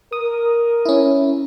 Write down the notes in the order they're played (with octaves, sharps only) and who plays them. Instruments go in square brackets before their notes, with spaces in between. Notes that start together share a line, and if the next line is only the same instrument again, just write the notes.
[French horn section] A#4 [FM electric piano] D#6
[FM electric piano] C#4 E4